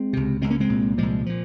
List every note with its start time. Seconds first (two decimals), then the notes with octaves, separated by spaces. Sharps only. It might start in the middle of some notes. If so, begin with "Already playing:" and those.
Already playing: G#3 C4
0.13 C#2 C3
0.41 C#2 C3 G#3 C4
0.50 A#3 C#4
0.60 G#3 C4
0.69 C2 A#2
0.98 C2 A#2 F3 G#3
1.26 A#2 F3